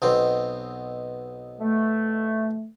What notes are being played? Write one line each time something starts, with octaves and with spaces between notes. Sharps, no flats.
B1 B2 C4
A3